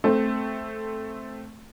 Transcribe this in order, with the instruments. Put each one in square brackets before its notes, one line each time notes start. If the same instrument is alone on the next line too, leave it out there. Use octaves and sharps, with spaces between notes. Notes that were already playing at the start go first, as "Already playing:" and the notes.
[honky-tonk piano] A3 C4